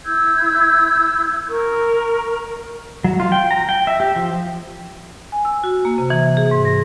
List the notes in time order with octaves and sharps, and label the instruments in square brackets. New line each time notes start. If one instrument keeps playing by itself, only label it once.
[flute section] E4 E6 G6 G#6
A#4 C#6
[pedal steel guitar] F#3
F4
G5
A#5
G5
E5
G4
F3
[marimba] G#5
E6
F#4
A#3
C3
E3
G#4
G#2
A#6